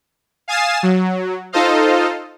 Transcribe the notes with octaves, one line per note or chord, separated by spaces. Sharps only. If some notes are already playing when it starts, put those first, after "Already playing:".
F5 G#5 D#6 A6 C7 E7
F#3
D#4 F4 A4 C5 D#5 F5